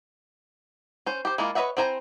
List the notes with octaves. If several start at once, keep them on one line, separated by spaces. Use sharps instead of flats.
C#4 C5
G4 C5
G#3 A#3 E4 F4
B4 C#5 D#5 E5 F#5
C4 E4 C5 G#5 A#5